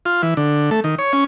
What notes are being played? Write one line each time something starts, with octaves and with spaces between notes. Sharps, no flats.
F4
E3
D3
A3
D#3
C#5
C#4